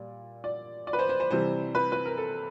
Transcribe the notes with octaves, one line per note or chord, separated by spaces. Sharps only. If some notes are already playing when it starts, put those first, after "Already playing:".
Already playing: A#2 G3 D5
D5
D5
B4
C5
C5
C5
C3 E3 G3 C5
B4
B4
A#4
A4